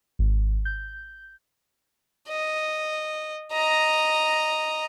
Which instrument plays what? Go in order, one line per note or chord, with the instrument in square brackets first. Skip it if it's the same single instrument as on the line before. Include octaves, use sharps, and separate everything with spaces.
[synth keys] G#1
G6
[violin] D#5
D#5 A#5